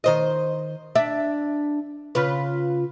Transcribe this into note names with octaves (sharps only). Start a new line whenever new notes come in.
D#3 C5 D#5
D4 E5
C#3 F4 B4